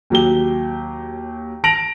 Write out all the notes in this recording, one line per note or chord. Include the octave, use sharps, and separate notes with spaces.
D#2 F#3 G4 G7
A5 A#6 D7 F7 F#7